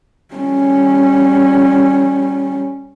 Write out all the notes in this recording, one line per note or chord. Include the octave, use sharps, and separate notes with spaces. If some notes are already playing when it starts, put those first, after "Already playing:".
G3 C#4